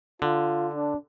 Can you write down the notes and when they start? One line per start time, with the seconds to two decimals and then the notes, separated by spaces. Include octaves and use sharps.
0.22 D3 F4
0.74 D4